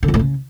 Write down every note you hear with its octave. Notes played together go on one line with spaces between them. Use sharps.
D3
F2
A2
C#3